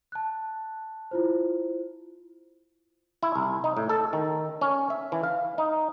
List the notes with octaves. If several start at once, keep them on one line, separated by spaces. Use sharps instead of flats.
A5 F#6
E4 F4 C5
E4
C2
D#4
A2
A4
D#3
C#4
E5
E3
F5
D#4